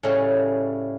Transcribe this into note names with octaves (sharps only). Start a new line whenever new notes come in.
A2 C#3 G3 A3 C#4